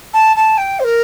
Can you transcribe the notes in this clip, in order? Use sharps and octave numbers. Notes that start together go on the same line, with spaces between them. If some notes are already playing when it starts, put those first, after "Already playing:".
A5
A5
G5
C5
A#4